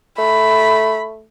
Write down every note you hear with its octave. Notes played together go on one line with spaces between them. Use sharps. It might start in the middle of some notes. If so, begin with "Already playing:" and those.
A3 B5